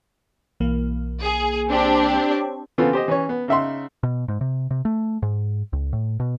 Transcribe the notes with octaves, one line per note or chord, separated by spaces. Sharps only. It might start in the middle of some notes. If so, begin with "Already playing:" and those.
B1 E3 A#3
G#4
C4 D4 G4
C#5
C#3 E3 B3 C4 F4 A4
G4 C5 D#5
E3 C#4 C#5
B3
C#3 D#4 E5 F#5 C6
B2
G#2
C3
C3
A3
G#2
C#2
A2
B2